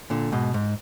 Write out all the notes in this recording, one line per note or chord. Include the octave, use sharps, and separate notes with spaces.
A#2 D3
G#2 B2
G#2